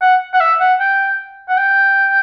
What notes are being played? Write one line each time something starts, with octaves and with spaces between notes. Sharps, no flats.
F#5
F#5
E5
F#5
G5
F#5
G5